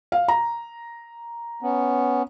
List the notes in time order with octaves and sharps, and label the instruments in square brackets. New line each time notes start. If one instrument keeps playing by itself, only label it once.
[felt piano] F5
A#5
[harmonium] B3 C#4